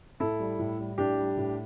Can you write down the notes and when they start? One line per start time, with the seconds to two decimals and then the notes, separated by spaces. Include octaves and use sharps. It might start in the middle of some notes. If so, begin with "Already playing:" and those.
0.20 A2 E4 A4
0.40 G3
0.59 A2
0.79 G3
0.98 A2 D4 G4
1.18 G3
1.37 A2